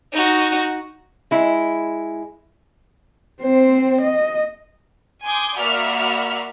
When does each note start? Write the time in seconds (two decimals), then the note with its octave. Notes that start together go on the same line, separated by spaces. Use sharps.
0.13 D#4 F#4
1.31 G#3 E4
3.41 C4 C5
4.01 D#5
5.23 G#5 C6 D6 D#6 G6
5.57 A#3 F#4 D5 E5 B5 F6